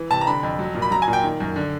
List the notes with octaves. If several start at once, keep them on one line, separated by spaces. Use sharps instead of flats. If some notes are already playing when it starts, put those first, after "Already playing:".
Already playing: E3
C3 A5
A#5
D3 B5
F2
F#3
A#2
B5
F#3 A#5
G#5
A#2
G5
D#3
F#2
D3